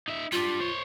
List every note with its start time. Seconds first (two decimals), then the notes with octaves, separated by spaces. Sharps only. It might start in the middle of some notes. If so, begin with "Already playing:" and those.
0.08 D#4 E5
0.32 G3 D4 F4
0.60 C5 C#5